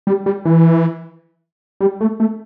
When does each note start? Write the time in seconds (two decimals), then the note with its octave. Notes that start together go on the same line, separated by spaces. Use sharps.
0.07 G3
0.26 G3
0.45 E3
1.81 G3
2.01 A3
2.20 A3